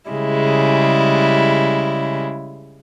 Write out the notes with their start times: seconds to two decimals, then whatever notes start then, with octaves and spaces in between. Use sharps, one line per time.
0.10 C#3 G3 G#3 E4